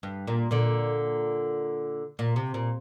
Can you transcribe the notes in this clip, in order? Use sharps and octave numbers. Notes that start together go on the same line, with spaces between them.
G2
A#2
A#2 D3
A#2
C3
A#2